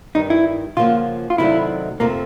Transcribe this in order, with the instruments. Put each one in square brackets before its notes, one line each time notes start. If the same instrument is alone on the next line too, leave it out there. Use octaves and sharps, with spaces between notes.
[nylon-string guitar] G2 D#3 G3 [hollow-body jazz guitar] D#4
[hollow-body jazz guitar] E4
[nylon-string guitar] C#3 F3 A#3 C#4 F#4 [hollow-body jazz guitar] F4
[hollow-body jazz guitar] F4
[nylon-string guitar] C3 D#3 F#3 A3 D4 [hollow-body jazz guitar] E4
[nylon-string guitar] F2 C3 F3 A3 [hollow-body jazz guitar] A#3